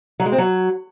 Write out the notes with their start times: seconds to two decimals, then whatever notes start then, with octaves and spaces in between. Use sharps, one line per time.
0.20 F#3
0.26 G#3
0.32 C4
0.38 F#3